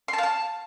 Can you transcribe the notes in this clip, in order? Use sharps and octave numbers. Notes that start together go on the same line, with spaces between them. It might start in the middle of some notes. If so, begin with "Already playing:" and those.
C6
A5
F5
A5